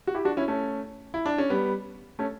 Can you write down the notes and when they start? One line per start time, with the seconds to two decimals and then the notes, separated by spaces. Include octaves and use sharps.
0.07 F#4
0.14 E4 G4
0.25 D4 F#4
0.37 C#4 E4
0.48 A3 C#4
1.14 E4
1.26 D4
1.38 C#4
1.50 G3 B3
2.19 A3 C#4